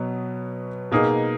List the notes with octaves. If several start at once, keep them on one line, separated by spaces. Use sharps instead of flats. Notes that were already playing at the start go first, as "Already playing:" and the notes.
Already playing: B2 F#3 B3
B2 A#3 D#4 G#4